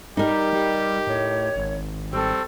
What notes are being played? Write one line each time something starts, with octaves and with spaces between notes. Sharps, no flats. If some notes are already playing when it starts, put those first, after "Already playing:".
G3 D#4 G4 A#4
G3
A2 C#5
G#1
G3 C4 A4 C#6 E6